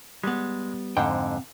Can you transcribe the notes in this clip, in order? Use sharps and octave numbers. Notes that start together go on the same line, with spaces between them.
G3 G#3 B3
F2 G#2 D3 C4 F#5 G5